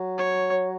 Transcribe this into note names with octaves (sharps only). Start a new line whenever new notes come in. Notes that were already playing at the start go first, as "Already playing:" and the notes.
Already playing: F#3
C#5